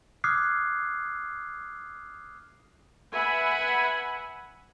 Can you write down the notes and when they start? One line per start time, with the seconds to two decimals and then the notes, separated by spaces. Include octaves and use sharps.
0.24 D6 D#6 F6 F#6 G#6 C7
3.13 B4 E5 F#5 G#5 B5